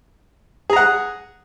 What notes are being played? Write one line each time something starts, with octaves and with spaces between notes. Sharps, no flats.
G#4 F#5 A#5